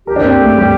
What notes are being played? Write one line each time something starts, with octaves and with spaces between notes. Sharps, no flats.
G4 A#4
D4
C4
A3
G3